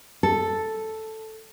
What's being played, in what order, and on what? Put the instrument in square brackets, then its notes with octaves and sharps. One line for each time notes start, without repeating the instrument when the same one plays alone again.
[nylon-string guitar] A4